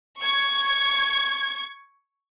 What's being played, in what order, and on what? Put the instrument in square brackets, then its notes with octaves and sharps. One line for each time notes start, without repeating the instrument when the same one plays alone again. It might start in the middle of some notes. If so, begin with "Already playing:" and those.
[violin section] C#6 G#6